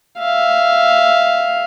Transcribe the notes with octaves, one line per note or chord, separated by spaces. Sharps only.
E5 F5